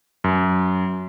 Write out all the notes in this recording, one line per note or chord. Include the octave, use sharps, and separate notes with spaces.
F#2